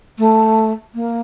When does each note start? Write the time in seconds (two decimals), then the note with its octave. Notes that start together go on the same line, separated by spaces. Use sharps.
0.18 A3
0.95 A#3